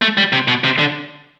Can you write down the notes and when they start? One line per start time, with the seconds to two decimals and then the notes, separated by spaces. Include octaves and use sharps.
0.02 A3
0.17 G3
0.33 C3
0.48 B2
0.64 C3
0.79 D3